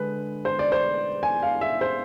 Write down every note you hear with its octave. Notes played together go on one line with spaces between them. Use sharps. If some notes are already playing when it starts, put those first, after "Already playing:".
Already playing: D3 G#3 D4 B4
C5
D5
C5
G#5
F5
E5
C5